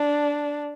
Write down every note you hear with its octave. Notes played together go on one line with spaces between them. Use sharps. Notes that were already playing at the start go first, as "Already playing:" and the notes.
Already playing: D4